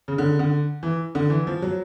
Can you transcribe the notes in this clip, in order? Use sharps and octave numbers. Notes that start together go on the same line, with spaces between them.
C#3
D3
D3
E3
D3
E3
F3
F#3